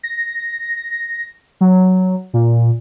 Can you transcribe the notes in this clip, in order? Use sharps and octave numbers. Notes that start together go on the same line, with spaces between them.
A#6
F#3
A#2